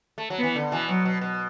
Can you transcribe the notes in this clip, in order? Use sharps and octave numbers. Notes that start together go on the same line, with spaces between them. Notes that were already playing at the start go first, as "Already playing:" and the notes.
A3
F#3
E3 B3
D3
B2 E3
B2 F#3
B2
B2